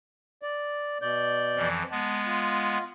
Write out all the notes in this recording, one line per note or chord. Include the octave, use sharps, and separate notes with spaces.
D5
B2 D5 G6
F2 E3 F3
G#3 B3 A5
F4